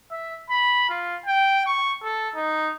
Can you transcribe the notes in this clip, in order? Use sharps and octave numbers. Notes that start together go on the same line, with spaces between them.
E5
B5
F4
G5
C#6
A4
D#4